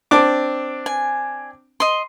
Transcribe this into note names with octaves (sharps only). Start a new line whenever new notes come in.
C4 D4 D6
G#5
D#5 C6